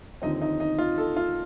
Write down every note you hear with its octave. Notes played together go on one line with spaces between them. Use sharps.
D#2 D3 F3 C4 D#4
D#4
D#4
F4
A4
F4